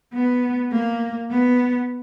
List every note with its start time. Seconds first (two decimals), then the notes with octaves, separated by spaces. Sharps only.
0.13 B3
0.71 A#3
1.30 B3